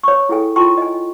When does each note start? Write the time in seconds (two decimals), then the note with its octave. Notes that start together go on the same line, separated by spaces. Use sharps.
0.03 C#5 C#6
0.29 E4 G#4 A4 G5 G#5
0.56 F4 G5 A5 C6 C#6
0.77 D#5 G#5